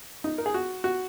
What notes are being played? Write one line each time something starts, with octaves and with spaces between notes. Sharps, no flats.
D#4
A#4
G#4
F#4
F#4